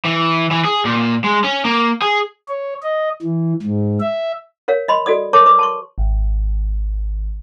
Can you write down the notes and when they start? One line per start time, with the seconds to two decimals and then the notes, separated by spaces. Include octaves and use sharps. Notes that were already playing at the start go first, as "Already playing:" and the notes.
0.05 E3
0.51 E3
0.65 G#4
0.85 A#2
1.24 G#3
1.44 C#4
1.65 A#3
2.02 G#4
2.49 C#5
2.82 D#5
3.22 E3
3.62 G#2
4.00 E5
4.68 A#4 C#5 F5
4.88 D#5 B5 C6
5.06 F#4 A4 D5 D#6
5.33 A#4 C#5 A5 D6
5.46 B4 D6
5.59 A5 C6 C#6
5.98 G#1